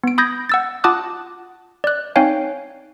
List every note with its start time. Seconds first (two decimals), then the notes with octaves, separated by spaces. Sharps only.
0.04 B3 D7
0.18 B5 D#6 G6 G#6 A#6
0.49 F#5 E6 A6
0.84 F4 F#5 A5 D6 D#6 F#6
1.84 D5 F#6
2.16 C4 D#4 C#5 F5 G5 G#5